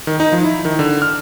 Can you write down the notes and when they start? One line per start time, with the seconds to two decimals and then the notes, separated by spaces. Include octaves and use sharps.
0.07 D#3
0.20 D#4
0.32 F3
0.44 E4
0.65 D#3
0.79 D3
1.02 F6